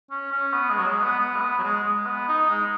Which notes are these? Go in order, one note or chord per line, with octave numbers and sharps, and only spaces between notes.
C#4
C#4
B3
G#3
F#3
G#3
B3
B3
G#3
B3
F#3
G#3
G#3
B3
D#4
G#3